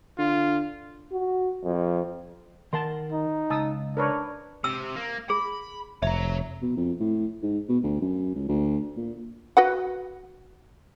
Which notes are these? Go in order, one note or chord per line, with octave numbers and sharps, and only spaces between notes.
D3 F4
F#4
F2
D#3 A#4 F#5 A5 C6
D#4
C#2 A5 D#6 E6
D4 A#4 B4 C#5
C3 E6
A#3
G#4 B5
F1 C#5 E5 A#5
B2
F2
A2
G#2
B2
D2
F#2
C#2
D2
A#2
F#4 B4 F#5